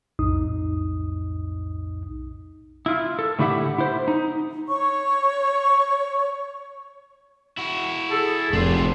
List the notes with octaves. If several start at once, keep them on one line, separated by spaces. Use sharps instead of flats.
B1 F2 A2 D#4 D#6
E4 F4
A4
A2 D3 E4 G4 E5 F#5
E4 C5 E5
D#4
C#5 C#6
E4 F#4
G#4 A4
F1 D4 F4 G4 F#5 C6